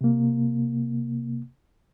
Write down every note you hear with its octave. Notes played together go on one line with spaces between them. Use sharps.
C3 A#3